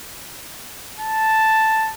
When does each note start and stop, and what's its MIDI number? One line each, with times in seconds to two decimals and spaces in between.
0.99 1.93 81